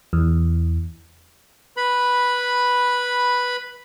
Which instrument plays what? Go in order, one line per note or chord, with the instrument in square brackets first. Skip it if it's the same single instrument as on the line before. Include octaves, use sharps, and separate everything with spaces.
[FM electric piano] E2
[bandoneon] B4 B5